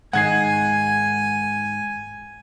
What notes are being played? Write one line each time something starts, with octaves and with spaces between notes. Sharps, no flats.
G#2 D#3 F#5 G#5 G#6 C7